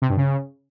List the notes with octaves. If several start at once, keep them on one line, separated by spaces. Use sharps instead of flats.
C3
G2
C#3